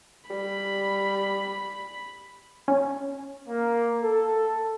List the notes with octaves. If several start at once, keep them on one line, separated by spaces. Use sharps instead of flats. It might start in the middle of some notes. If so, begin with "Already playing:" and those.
G3 B5
C#4
A#3
A4